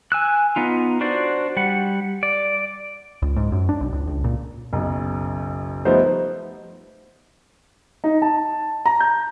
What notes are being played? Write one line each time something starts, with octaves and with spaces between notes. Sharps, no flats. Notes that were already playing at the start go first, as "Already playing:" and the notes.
G#5 E6 F#6
B3 D#4 F4
D4 F#4 C5 D5
G3 F#5
D5
C#2
G#2
F#2
D4
B1
C#2
C#2
A#2
F#1 B1
F3 G3 A3 B3 D#4 C5
D#4
A5
A#5
G6